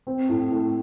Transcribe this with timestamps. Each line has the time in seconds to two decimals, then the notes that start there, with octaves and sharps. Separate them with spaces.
0.07 C4
0.29 A2
0.52 A3